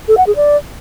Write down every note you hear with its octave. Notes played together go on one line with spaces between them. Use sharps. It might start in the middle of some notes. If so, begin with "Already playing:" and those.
A4
F#5
G#4
D5